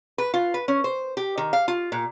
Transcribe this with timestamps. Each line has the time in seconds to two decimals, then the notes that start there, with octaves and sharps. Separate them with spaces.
0.18 B4
0.34 F4
0.54 B4
0.68 C#4
0.84 C5
1.17 G4
1.38 D#3
1.53 F5
1.68 F4
1.92 A#2